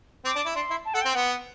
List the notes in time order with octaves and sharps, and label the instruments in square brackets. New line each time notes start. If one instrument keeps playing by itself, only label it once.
[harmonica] C4 [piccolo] D6
[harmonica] D4
E4
[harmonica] D4 [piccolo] C6
[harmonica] E4
[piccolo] A5
[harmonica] A4 [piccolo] F#5
[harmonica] C4 [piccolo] G5
[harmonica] B3 [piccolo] F#5